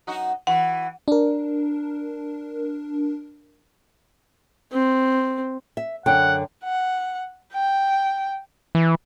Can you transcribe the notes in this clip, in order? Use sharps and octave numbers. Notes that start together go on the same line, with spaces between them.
F#2 D#4 F#4
E3 F#4 F#5
D4 A#4
C4
E5
F#2 D3 F#5 G5
F#5
G5
E3